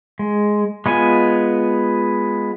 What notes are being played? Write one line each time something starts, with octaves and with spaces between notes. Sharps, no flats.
G#3
G#3 B3 F4 G#5